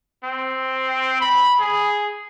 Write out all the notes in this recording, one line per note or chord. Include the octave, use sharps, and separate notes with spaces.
C4
B5
G#4